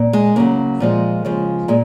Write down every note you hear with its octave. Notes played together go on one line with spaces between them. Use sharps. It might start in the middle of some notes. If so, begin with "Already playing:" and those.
Already playing: A#2
G#3
C#3 F#3 A#3
A#2 F3 G#3
C#3 F3 G#3
A#2 G#3